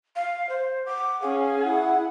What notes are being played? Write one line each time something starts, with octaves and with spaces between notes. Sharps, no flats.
F5
C5
F#5 D6
C#4 G#4 F5
E4 F#5